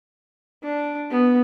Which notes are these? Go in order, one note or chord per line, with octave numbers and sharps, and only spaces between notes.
D4
B3